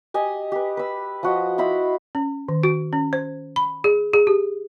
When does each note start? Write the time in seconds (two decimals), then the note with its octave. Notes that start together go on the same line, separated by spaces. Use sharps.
0.14 G4 D#5 G#5
0.52 G4 B4
0.77 B4 E6
1.23 F3 F#4 D#5
1.58 E4 C5 D#5 B5
2.15 C#4
2.48 D#3
2.63 F#4
2.93 C#4
3.13 C5
3.56 B5
3.84 G#4
4.14 G#4
4.27 G4